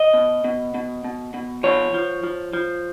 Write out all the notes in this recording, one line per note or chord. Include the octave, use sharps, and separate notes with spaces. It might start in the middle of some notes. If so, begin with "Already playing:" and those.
Already playing: D#5
B2
B2
B2
B2
B2
F3 C#5
F3
F3
F3